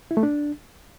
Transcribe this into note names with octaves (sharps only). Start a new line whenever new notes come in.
E4
A3
D4